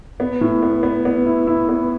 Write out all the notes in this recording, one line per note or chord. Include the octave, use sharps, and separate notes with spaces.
B3
A2
B3
B3
B3
E4
E4
B3